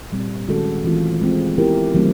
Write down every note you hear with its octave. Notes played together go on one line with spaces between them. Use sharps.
A#2 G3 C4
D#3 G#3 C#4 F#4 A4
E3 A3 C4 F4
G#3 C4 F4
B3 E4 G4 A#4
D#3 F#3 A3 C4